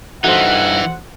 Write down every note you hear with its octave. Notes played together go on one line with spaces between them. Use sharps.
G2 E3 D#4 F#4 A4 C5 F#5